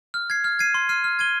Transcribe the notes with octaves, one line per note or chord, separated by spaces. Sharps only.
F6
G#6 C7
F6
G#6 C7 D#7
C6
F6 C7 D#7
F6
G#6 D#7 G7